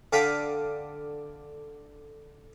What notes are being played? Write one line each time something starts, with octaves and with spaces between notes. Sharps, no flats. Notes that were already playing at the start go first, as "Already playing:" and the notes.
D3 F5 G5 B5